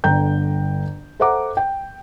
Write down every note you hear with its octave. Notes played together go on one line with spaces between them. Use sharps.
G1 D3 G5 A#5 G6
A4 C5 E5 F#5 A#5 D6
G5